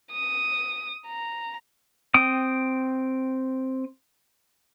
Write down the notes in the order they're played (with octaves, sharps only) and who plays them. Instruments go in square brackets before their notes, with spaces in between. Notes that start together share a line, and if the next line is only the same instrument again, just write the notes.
[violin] D#6
A#5
[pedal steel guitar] C4 G5 D#6